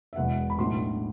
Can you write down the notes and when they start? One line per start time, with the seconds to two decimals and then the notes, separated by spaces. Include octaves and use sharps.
0.13 E5
0.16 E1 E2 B2 F#5
0.50 B5
0.58 B1 A2 F#3 B3 D4 C6